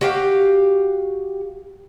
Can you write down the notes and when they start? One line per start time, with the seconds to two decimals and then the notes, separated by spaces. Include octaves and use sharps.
0.01 F#4 G4 F5